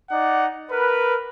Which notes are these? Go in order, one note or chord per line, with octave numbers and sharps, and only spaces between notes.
D#4 D5 F#5
A#4 B4